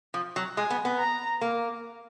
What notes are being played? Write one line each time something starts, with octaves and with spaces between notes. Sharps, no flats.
F3
F#3
G#3 G#5
B3
B3
A#5
A#3